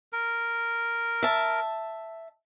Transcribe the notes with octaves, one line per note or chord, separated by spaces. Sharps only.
A#4
E5 A5